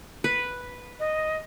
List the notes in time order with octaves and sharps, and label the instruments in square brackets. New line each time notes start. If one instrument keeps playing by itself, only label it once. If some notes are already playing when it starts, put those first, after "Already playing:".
[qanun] B4
[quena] D#5